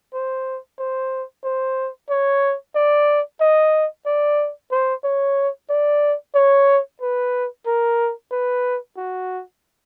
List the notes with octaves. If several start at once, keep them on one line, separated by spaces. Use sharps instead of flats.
C5
C5
C5
C#5
D5
D#5
D5
C5
C#5
D5
C#5
B4
A#4
B4
F#4